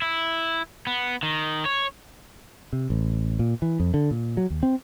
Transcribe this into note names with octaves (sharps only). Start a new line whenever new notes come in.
E4
B3
D#3
C#5
C3
A1
A#2
E3
F2
D3
A#2
F#3
D#2
C4